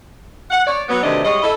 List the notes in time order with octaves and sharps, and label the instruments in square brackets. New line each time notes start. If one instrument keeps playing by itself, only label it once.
[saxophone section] F#5
C#5 D5
F#3 B3
D2 C3 D#3 E3 D4 D#5
G3 G#3 C#5 D#5
E4 A4 D#5